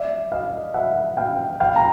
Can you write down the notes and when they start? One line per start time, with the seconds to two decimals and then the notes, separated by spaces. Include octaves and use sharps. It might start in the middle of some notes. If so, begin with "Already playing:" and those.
Already playing: D5 E5
0.32 D#5 F5
0.74 E5 F#5
1.17 F5 G5
1.60 F5 G5
1.76 A#5